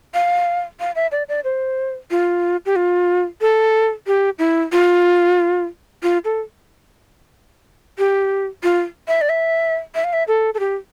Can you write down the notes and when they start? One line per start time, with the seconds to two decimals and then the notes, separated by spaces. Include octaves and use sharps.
0.14 F5
0.80 F5
0.95 E5
1.12 D5
1.29 D5
1.44 C5
2.11 F4
2.66 G4
2.76 F4
3.41 A4
4.07 G4
4.39 E4
4.72 F4
6.03 F4
6.25 A4
7.98 G4
8.63 F4
9.08 E5
9.21 D5
9.29 E5
9.95 E5
10.04 F5
10.13 E5
10.28 A4
10.54 A4
10.59 G4